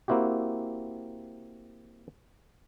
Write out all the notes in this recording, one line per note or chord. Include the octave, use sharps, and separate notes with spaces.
A#3 C4 E4 F#4 G4